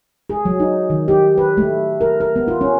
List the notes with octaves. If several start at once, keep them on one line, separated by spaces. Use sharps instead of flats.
G#4
F#3
D#4
D#3
G4
B4
A3
A#4
A#4
B3
F4
C#4